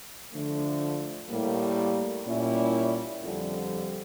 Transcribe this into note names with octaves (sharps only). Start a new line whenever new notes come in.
D3 F3 A3
A2 G3 A#3
A#2 G3 C#4 E4
F2 D3 G3